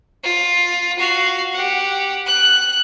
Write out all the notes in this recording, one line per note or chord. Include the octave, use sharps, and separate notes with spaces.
F4
F#4 F5
G4 F#5
F#6